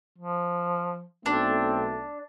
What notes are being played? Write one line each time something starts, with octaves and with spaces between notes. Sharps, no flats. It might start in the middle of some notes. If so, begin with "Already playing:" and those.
F3
B1 A3 C4 D4